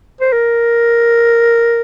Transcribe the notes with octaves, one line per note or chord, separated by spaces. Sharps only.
C5
A#4